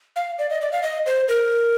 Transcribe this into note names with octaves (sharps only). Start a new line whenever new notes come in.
F5
D5
D#5
D5
F5
D#5
C5
A#4